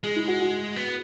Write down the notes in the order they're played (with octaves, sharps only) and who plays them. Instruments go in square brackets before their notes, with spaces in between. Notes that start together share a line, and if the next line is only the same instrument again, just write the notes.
[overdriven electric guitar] G#3 [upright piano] G#4
[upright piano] E4
F#4
F#4
[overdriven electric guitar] B3